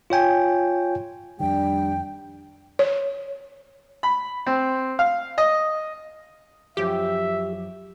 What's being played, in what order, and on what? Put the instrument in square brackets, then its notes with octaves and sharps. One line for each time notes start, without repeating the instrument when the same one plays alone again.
[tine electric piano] F4 C#5 G5 G#5
[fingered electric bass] F2 D#3 [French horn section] G3 D4 [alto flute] G5
[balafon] C#5
[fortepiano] B5
C4
F5
D#5
[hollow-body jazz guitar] F#2 F3 [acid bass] G4 [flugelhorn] E5